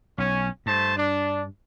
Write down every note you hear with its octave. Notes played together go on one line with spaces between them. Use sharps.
B1 C#4
G2 A3 C5 A5
D4